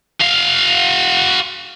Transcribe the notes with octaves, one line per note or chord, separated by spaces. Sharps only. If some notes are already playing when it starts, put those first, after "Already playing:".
F#4 F5